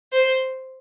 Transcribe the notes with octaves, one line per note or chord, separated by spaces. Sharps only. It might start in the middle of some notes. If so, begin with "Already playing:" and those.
C5